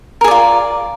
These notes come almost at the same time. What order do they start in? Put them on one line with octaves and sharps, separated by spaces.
A#4 G#4 D5 F4